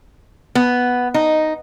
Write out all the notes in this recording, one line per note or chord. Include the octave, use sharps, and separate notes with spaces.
B3
D#4